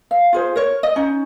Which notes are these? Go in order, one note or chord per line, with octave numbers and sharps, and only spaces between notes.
F5
F4 G#4 C5
A#4 C#5
D#5
C#4 D#4